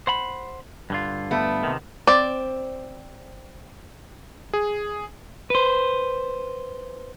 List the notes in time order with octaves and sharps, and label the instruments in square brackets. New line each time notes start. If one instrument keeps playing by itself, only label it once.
[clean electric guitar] C5 F#5 B5
G2 D3 F4
[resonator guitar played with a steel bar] A3 B3
[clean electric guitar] C3 D#3
[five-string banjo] C4 D5
[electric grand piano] G#4
[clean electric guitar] B4 C5